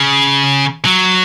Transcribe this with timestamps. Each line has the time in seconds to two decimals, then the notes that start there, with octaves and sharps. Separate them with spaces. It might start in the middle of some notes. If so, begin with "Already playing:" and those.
Already playing: C#3
0.85 F#3